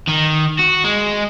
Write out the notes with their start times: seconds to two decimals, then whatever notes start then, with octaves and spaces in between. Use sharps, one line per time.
0.09 D#3
0.59 F#4
0.84 G#3